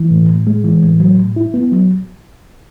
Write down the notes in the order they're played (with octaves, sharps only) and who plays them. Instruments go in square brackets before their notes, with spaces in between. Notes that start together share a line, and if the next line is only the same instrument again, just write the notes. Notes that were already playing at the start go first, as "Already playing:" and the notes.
Already playing: [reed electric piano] E3
A2
A2
G#3
E3
A2
F#3
A2
E4
B3
F#3